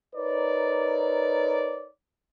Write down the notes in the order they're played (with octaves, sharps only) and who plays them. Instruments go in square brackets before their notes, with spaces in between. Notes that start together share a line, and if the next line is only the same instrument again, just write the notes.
[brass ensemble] D#4 A#4 B4 C#5 D5